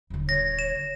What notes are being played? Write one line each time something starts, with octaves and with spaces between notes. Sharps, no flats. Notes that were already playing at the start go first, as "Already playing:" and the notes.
D#1 D3
C#5 A#6
E7